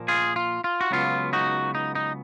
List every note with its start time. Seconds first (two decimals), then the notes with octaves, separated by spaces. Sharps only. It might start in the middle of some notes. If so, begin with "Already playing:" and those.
Already playing: A#2 F3 A#3
0.08 F4 G#4
0.36 F4
0.64 F4
0.81 F#4
0.91 C#2 C#3 F#3 B3 F4
1.33 D#4 F#4
1.75 D#4
1.95 D#4